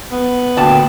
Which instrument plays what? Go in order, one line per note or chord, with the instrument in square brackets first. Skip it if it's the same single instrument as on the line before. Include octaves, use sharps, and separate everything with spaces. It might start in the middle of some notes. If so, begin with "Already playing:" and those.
[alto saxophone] B3
[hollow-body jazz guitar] D2 A#2 A5 [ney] G5